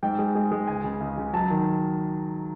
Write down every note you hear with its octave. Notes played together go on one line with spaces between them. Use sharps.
G#2 G5
G#3
G#3
G#3
C#2 G#5
C#3
C#2
C#3
F#3 A5
D#3